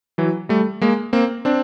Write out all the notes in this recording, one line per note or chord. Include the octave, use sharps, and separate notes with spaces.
E3 F#3
G3 A3
G#3 A#3
A#3 C4
C4 D4